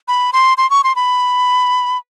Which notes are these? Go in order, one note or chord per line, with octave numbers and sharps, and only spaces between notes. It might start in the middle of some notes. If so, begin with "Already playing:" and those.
B5
C6
C6
C#6
C6
B5